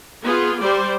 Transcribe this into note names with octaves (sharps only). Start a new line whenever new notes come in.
B3 F4 G#4
G3 C5 D5